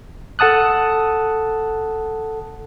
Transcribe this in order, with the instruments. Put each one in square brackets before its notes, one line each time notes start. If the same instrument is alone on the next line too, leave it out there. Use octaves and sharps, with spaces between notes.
[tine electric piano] A4 F#5 A5 D#6 F#6